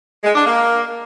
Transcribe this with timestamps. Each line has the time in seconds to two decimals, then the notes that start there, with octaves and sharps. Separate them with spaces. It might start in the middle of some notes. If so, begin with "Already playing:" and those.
0.24 G#3
0.35 D4
0.45 A#3